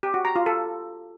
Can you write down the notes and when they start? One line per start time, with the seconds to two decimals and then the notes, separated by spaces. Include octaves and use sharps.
0.03 G4
0.14 F#4
0.25 A#5
0.35 F4
0.46 A4